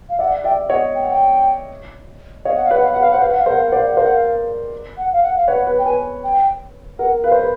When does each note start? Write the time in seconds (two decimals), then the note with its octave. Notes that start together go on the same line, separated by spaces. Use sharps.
0.09 F5
0.19 D5 E5 F#5
0.44 D5 E5 G5
0.69 C#5 D#5 F#5
0.95 G5
1.02 F#5
1.10 G5
2.45 C#5 D#5 F5
2.55 F#5
2.64 F5
2.71 B4 C#5 F#5
2.83 F5
2.92 B4 F#5
3.01 F5
3.11 C5 F#5
3.20 B4 F5
3.29 F#5
3.39 F5
3.46 A#4 C5 F#5
3.57 F5
3.66 F#5
3.72 C5 D5
3.75 F5
3.85 F#5
3.94 A#4 C5 F5
4.04 F#5
4.13 F5
4.97 F#5
5.13 F5
5.23 F#5
5.37 F5
5.48 B4 C#5 F#5
5.67 B4
5.79 G5
5.85 B4 G#5
6.24 G5
6.99 A#4 F#5
7.24 B4 F5
7.32 C5
7.39 B4